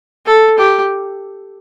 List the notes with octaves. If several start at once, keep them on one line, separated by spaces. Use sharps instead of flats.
A4
G4